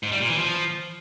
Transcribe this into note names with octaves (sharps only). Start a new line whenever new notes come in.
G#2
G3
A#2
E3
F3